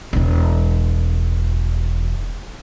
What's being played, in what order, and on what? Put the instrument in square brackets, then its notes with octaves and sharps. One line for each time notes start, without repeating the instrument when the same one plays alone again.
[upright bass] E1 E2